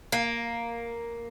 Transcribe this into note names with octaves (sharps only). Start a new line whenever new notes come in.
A#3